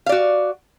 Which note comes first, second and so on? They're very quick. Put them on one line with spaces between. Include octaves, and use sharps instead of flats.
F5 D5 F#4